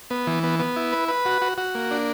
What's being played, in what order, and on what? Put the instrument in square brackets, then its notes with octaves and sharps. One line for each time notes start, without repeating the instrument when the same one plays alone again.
[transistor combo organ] B3
E3
B3
B3
E4
B4
B4
F#4
F#4
F#4
A#3
D4